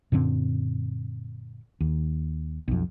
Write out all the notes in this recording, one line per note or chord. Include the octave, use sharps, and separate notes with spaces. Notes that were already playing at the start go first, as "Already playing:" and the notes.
F#2 A#2 D3 C4
D#2
B1 F2